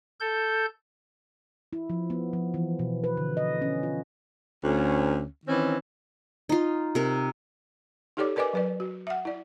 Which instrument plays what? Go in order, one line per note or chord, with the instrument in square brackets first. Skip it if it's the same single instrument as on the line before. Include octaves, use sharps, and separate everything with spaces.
[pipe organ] A4 G6
[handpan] E4
F3
B3
F3
E3
B2
B4
D3
D#5
C#4
F4
[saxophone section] D2 C#4
D#3 E3 C4 C#4
[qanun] D#4 F4
C3 A#4
[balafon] D#4 G4 A4 C#5 D5 D6
A#4 B4 D5 D#5 G#5 D6
F#3 B4 D5
F#4
E5 F#5
E4 D5